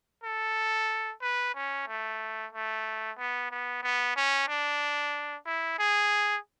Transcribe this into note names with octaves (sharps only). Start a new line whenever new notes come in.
A4
B4
C#4
A3
A3
B3
B3
B3
C#4
D4
E4
G#4